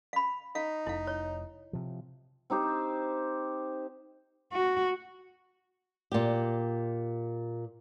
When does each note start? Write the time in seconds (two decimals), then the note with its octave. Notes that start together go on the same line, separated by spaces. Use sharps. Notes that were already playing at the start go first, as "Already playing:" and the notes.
0.13 F5 B5
0.55 D#4 F5
0.87 F1 E4 F5
1.07 C#5
1.73 C3 F3
2.50 C4 D#4 G4 C5
4.53 F#4
6.12 A#2 G4